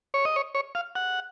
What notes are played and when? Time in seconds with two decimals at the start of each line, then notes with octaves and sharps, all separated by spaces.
0.14 C#5
0.25 D#5
0.36 C#5
0.55 C#5
0.75 F5
0.95 F#5